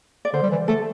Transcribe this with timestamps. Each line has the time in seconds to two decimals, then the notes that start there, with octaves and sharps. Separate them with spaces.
0.25 D5
0.33 D3 C5
0.42 G3
0.51 E3
0.68 A3 A4